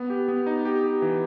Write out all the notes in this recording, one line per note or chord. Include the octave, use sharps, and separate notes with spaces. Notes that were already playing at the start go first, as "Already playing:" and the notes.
Already playing: B3
G4
B3
D#4
G4
G4
E3